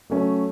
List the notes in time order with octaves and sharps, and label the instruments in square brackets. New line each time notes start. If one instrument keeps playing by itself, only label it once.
[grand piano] F#3 A3 C#4